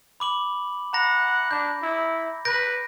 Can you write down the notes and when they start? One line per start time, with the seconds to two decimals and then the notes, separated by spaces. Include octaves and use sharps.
0.20 B5 D6 F#7
0.94 F#5 A#5 B5 A#6
1.51 D4 G6
1.82 E4
2.45 B4 G6 A#6 D7